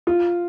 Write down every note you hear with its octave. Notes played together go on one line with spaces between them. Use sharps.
F4